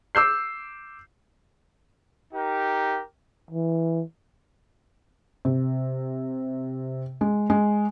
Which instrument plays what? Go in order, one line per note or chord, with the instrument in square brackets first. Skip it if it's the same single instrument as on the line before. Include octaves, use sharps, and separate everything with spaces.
[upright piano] D6 E6 G6 C7
[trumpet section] D#4 G4 A#4
[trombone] E3
[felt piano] C3
G#3
G#3